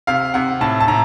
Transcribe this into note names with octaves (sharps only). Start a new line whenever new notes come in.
C3 F5
C3 F#5
A2 A5
A5
A2 A#5